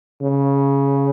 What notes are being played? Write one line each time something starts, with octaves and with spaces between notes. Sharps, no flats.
C#3